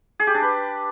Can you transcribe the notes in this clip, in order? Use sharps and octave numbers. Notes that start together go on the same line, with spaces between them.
G#4
G4
D4
B4